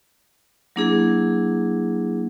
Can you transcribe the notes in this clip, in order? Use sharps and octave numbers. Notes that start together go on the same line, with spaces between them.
F#3 A#3 D4 E4 G#4